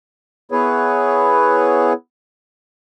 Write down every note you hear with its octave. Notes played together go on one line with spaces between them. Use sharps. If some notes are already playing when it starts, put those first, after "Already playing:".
B3 E4 G#4 B4 C#5